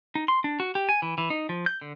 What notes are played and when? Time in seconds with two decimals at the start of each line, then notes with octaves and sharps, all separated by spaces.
0.15 D#4
0.28 C6
0.44 D4
0.60 F#4
0.75 G4
0.89 G#5
1.02 E3
1.18 E3
1.30 D#4
1.49 F3
1.66 G6
1.81 D3